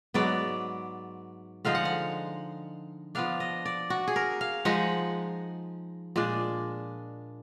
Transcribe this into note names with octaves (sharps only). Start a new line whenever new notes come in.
G#2 F#3 B3 D5
D3 F3 G#3 D#4 F5
F#5
F5
F3 B3 D4 F5
D#5
D5
F#4
G#4
A#4
F5
F3 G#3 D#4 F#5
A#2 G#3 D4